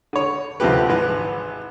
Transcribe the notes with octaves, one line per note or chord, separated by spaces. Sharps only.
D3 C#5
D2 C3 F3 A3 G4 B4
G#1 E3 B4